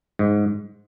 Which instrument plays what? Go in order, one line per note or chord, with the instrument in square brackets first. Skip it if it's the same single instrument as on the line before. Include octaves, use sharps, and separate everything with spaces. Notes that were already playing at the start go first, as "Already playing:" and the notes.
[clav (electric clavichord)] G#2